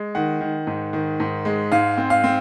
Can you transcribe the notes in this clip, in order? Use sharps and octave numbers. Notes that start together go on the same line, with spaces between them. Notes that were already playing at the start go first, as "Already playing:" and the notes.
Already playing: G#3
D#3 F#5
D#3
G#2
D#3
G#2
G#3
G#2 F5
C4
F5
C4